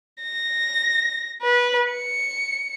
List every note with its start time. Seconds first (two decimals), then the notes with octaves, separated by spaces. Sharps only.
0.23 A#6
1.42 B4
1.92 C#7